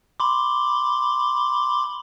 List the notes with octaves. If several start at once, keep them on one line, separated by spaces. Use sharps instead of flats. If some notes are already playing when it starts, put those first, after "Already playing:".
B5 C6 D6